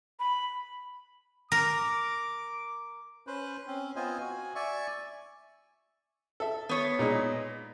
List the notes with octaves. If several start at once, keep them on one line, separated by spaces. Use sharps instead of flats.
B5
A#4 D6
C#4 B4 C5
C4 C#4
B3 C4 F4 C5 D#5 G#5
F#4 G#5
D5 E5 G#5 C#6
A4 E5
B3 C#5
A#2 G#3 D#4